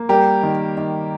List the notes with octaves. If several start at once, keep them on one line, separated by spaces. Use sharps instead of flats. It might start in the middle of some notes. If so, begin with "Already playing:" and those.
Already playing: A#3
G3 G4 A#4
D#3
D#3